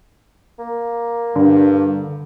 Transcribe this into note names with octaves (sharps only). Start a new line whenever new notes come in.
A#3
G2 D3